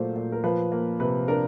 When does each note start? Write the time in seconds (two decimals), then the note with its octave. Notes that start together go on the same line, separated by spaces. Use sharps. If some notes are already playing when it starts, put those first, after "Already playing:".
Already playing: A#2 F#3 A3 C5
0.16 A#2
0.32 A#4
0.44 F3 B4
0.72 A#3
1.00 C3 B4
1.28 D4 A#4